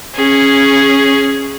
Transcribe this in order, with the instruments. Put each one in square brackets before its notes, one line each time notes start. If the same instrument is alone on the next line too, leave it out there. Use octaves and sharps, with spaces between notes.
[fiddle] C#4 G#4